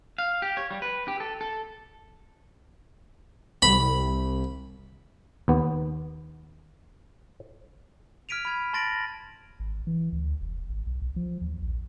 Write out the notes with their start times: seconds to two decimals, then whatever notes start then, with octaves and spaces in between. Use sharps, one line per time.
0.18 F5
0.42 G4
0.57 C#5
0.71 G3
0.82 B4
1.08 G4
1.20 A4
1.41 A4
3.62 C2 B5
5.48 D#2 B3
8.29 F6 G#6 B6 D7 D#7 F7
8.45 B5 G#6
8.73 A5 C6 A6 A#6 D7 F#7
9.60 G#1
9.87 E3
10.12 D2
10.41 F1
10.69 G#1
10.86 B1
11.02 B1
11.16 F3
11.41 D#2
11.62 A#1